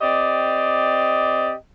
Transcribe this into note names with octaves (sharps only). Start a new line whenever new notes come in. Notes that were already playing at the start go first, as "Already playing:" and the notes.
C4 G4 D5 D#5